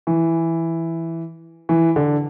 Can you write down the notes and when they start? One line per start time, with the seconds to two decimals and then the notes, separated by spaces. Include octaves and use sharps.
0.07 E3
1.69 E3
1.96 D3